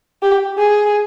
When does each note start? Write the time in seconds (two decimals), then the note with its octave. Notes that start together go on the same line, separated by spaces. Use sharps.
0.22 G4
0.58 G#4